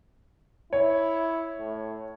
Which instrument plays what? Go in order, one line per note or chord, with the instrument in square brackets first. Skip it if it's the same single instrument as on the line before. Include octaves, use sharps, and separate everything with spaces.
[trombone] E4 [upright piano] C#5
[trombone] A2